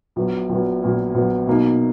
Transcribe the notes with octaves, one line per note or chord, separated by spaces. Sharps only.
A#1 A#2 F#3 B3
A#1 A#2 F#3 B3
A#1 A#2 F#3 B3
A#1 A#2 F#3 B3
B2 F#3 A#3 D#4